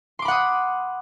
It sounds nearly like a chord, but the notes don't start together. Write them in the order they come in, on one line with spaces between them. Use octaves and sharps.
C6 D6 B5 F#5 D#6